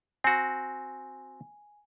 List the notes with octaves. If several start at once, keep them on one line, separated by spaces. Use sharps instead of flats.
C4 F#4 G#5